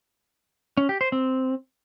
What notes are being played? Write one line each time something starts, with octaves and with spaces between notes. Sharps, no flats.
C#4
G4
C5
C4